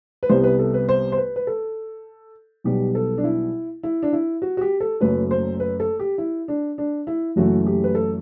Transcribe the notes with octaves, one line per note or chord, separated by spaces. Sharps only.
B4
C2 C3 G3 B3 C5
B4
A4
B4
C5
C5
B4
B4
A4
B1 B2 G3 B3 G4
A4
D4
E4
E4
D4
E4
F#4
F#4
G4
A4
F#1 F#2 F#3 A3 B4
C5
B4
A4
G4
E4
D4
D4
E4
F#1 F#2 E3 A3 F#4
G4
B4
A4